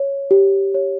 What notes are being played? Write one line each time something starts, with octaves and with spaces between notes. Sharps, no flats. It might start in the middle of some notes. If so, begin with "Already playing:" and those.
Already playing: C#5
G4
C#5